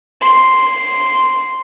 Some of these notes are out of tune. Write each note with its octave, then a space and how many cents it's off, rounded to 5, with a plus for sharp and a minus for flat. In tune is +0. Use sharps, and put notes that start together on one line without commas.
C6 -5